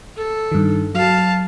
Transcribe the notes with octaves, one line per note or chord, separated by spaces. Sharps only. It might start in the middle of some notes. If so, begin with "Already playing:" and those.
A4
G2 D#3
F#3 F5 A5